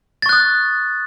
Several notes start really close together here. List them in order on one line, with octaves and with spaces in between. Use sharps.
A6 C#6 F#6 D#6